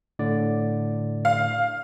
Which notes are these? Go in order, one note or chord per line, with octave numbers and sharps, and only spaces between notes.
A2 D3 D5
F5